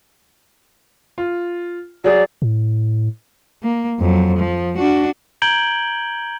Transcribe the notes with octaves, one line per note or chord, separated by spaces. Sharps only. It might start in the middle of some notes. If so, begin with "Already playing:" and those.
F4
F#3 G#4 D5
A2
A#3
F2 F#3
F3
D4 F#4
A#5 G6 G#6 D7 F#7 G7